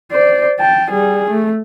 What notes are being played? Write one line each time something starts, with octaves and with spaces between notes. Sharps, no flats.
C5 D5
G5 A5
G3 G#4
A3